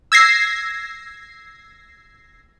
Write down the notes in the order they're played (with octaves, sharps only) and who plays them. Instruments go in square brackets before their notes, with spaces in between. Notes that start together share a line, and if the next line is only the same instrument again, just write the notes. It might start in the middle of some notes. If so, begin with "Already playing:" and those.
[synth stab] E6 G#6 A#6 C7